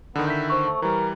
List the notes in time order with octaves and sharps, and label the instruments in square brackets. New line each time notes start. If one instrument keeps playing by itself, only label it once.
[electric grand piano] D3 D#3 [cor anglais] B3
[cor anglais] E4 [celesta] G6 B6
[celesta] C5 C#6
[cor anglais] A3
[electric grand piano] E3 G3 [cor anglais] A#4